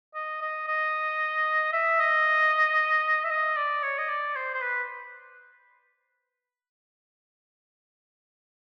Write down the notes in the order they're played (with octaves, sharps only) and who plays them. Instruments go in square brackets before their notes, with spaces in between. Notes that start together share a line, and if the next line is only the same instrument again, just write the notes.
[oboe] D#5
D#5
D#5
E5
D#5
E5
D#5
D5
C#5
D#5
D5
C5
C5
B4